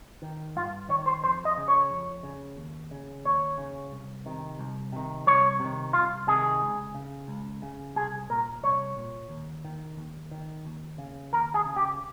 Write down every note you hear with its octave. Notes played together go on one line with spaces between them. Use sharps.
D#3
G2 F4
D#3 C#5
C5
F2 C5
D#5
C#3
C#5
F2
C#3
D#2
C#3
D#2 C#5
C#3
C2
C3 D#3
C2
C3 D#3
C2 C#5
C3 D#3
C2 F4
C3 D#3 G#4
C#2
C#3
C#2
C#3
C2 G#4
A#2 A#4
C2 C#5
A#2
D#2
D#3
D#2
D#3
D#2
C#3
D#2 A#4
G#4
C#3
G4